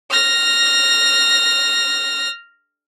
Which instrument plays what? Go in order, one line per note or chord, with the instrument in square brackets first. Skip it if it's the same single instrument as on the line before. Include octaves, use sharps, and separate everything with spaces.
[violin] F6 A#6